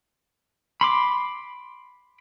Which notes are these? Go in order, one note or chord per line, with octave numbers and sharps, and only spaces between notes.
B5 C6 D6